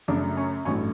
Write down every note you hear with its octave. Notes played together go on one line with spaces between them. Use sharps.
F#2 C#3 F#3 A3 D4
C#4
A1 G2 F#3 A3 C#4